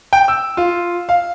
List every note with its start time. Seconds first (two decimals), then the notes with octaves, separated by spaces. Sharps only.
0.13 G5
0.28 E6
0.57 F4
1.09 F5